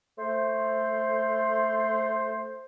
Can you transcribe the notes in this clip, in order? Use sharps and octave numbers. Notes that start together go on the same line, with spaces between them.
A3 C5